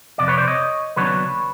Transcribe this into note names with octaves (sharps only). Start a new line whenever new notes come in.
F2 C3 D5
B4 C#5
C5 D5
C#5 D#5
D#2 C#3 F#3 B3 D4 B4 C#5